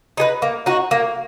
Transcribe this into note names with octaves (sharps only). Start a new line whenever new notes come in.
D#4 G#4 B4
A#3
D#4 F#4
A#3